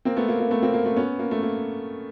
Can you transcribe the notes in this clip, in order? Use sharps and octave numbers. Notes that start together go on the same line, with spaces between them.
A#3 C4
A3 B3
A#3
A#3
A3 B3
A#3 C4
A#3
A3
B3 C#4
A#3
A3
A#3